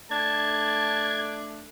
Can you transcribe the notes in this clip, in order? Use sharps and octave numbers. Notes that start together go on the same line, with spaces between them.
A3 D4 A5 G#6